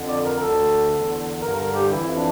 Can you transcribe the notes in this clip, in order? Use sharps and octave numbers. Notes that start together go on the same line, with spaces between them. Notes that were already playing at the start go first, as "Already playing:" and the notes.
Already playing: F2 D3
D5
A#4
D2 D3 A4
E2 D3
G2 D3 A#4
A#4
G4
F2 E3 E4
D4